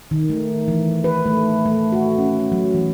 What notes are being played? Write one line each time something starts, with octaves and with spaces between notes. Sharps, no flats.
D#3
A3
E3
B4
A3
A3
F#4
C#4
F#3
E3